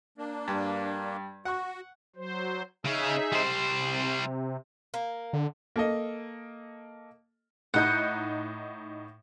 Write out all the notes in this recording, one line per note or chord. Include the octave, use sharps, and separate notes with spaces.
A#3 D4
G2
F#4 F#5 C#6
F#3 C5
C#3 C#4 D#4 G#4 E5
G3 C5
C3
A#3
D3
A#3 A4 D#5
A2 D#4 F#5 G6